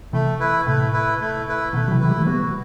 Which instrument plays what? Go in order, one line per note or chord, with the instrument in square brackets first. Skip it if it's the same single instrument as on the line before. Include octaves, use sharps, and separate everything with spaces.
[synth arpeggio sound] C3 E3 [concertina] A3
[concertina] E4 B4
[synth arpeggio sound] A2 C3 [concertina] A3
[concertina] E4 B4
A3
E4 B4
[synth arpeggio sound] B2 D#3 [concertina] A3
[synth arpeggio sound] F#3
C3 E3
[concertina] E4 B4
[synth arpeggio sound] E3 G3
A3
[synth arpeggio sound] G3 B3 [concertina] F#4